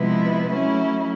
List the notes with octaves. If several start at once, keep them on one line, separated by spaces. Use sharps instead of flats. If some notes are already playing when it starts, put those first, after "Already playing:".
Already playing: C3 F3 G#3 B3 E4
F#3 A3 C#4 E4